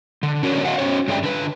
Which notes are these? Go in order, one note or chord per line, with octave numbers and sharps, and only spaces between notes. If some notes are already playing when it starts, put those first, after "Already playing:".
D3
C#4 D4 F#4 A#4 C#5 D5
F#4 D#5 F5 F#5
C#4 F#4 C5 C#5
G2 D3 G#4 D5 E5 G5
D3 B4